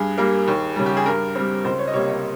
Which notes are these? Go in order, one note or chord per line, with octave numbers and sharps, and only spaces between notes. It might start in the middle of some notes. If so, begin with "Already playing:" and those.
Already playing: G2 G#4
G3 A#3
D#2
C#3 G3
G4
G#4
G2 A#4
G3 C4
C#2 C5
C#5
D#5
C3 G3 A#3 C#5
C#5